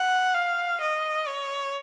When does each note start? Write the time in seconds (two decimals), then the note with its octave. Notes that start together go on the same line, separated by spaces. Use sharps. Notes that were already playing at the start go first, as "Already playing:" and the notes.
Already playing: F#5
0.34 F5
0.81 D#5
1.28 C#5